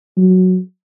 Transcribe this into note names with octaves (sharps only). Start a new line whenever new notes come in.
F#3